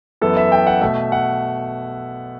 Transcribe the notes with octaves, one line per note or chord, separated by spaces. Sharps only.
F#2 E3 B3 A4
E5
G5
F#5
B2 A3 E5
F#5